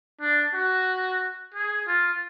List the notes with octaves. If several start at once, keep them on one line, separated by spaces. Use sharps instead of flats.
D4
F#4
G#4
F4